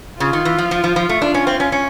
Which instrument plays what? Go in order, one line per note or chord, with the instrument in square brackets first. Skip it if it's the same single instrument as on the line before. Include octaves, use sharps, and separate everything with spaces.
[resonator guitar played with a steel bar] C#3 [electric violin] F4
[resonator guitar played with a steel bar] D#3
E3
F3
F3
F3
F3
A3
[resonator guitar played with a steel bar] D4 [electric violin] F4
[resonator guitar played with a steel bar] C#4
C4
C#4
C#4